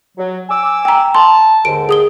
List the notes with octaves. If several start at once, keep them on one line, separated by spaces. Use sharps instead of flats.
F#3
G#5 D6 E6
G5 A#5
A5 C6
D#2 G#2 D3 D7
G#4 D#6 G7